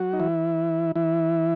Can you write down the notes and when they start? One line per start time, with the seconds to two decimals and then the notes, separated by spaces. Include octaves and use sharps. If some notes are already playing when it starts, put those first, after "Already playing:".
Already playing: F#3 F#4
0.13 D#4
0.20 E3 E4
0.96 E3 E4